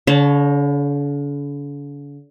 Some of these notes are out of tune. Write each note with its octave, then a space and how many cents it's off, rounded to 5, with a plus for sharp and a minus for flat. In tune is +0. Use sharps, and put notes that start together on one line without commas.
D3 -45 C#5 +0 A5 +0